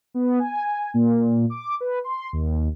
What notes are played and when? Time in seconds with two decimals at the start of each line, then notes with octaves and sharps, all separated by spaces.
0.14 B3
0.39 G#5
0.94 A#2
1.50 D6
1.81 B4
2.04 C6
2.33 D#2